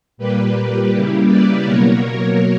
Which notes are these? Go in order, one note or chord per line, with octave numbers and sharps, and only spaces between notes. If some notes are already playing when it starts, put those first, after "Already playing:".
A#2 G3 A#3 G4 B4
C#3 G3 A#3 E4 G4
B4 D5
B2 F#3 A#3 A#4 C#5